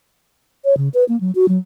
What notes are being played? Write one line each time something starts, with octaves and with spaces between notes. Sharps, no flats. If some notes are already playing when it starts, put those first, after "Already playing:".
C#5
C#3
B4
A#3
F#3
F#4
F#3